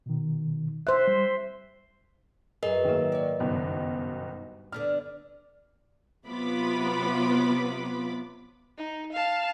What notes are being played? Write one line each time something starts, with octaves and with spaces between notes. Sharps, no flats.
B2 D#3
C5 E5 F#6
G3
F#2 G#4 A#4 B4 D#5
G#2 D#3 A#3 E5
C#5 D5
F#1 B1 G2 D#3
D3 B3 D4 F6
C3 F#3 B3 F4 B5 D6
D#4
F5 A5